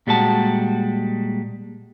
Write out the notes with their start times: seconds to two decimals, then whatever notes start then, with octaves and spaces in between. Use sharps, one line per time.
0.07 A#2 G3 G#3 F#4 A5